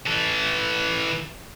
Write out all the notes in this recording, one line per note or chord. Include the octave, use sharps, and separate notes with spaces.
E3 A4